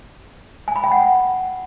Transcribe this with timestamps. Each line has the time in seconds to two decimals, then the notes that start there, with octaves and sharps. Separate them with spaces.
0.68 G#5
0.76 B5
0.84 G5
0.92 F#5